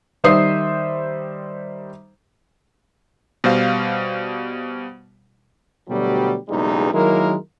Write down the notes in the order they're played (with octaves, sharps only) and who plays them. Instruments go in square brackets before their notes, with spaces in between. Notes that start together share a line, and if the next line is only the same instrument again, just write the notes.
[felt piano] D#3 G3 C5 E5 D#6 C7
[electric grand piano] B2 G3 C5 F5
[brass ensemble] D2 B2 F#3 G3
F#1 B1 E2 G3 G#3 D#4
D#3 F#3 G#3 A#3 E4 A#4